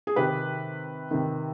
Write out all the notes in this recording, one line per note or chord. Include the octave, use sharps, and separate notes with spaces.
G#4
C3 D#3 G4 B4
C3 D#3